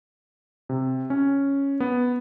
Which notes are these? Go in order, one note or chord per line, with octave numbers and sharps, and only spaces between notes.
C3
C#4
B3